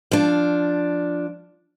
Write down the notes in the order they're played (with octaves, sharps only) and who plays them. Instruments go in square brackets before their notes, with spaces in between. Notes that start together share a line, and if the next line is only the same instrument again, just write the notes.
[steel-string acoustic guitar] F3 D4